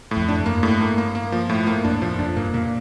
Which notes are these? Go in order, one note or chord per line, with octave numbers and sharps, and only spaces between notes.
A2
F2
D4
G2
A#3
A2
A#3
A#3
A#3
F3
A2
A#3
F2 D4
G2
A2 F3
F2 D4
G2 A#3
A#2 A#3